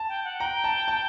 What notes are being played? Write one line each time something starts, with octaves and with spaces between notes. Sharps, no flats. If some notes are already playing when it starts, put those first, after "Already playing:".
Already playing: A5
G5
F#5
G5 A#5
A5
A5